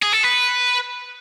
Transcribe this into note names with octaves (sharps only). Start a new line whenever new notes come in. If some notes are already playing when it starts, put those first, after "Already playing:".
G#4
A4
B4